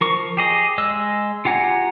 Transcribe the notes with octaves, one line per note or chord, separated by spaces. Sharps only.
F3 A#4 C#6
G4 G#4 D#5
G#3 D#5 E6
F4 G4 F#5 G#5 A#5